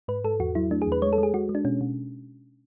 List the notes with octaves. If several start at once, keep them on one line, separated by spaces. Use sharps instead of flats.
G#2 B4
G#2 A4
E2 F#4
F#3 E4
A3 D4
G#4
E2
B4
G#3 C#5
A4
G#3
G#4
G#3 F#4
G#3
D4
B2 C#4
B2